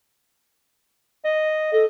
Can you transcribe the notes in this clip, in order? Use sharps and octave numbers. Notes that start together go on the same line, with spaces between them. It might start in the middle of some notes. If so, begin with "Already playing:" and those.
D#5
A4 D#5